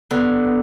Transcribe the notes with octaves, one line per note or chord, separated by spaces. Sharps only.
D3 B3
B3